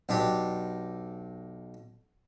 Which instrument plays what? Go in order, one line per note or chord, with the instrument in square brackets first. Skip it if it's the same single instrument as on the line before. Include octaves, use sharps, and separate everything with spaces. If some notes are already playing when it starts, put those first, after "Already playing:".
[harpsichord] B1 D4 G4